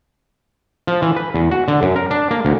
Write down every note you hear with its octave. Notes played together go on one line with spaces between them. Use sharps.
F3
E3
B4
E2
F#4
D3
F#2
A#4
D4
A#3
D2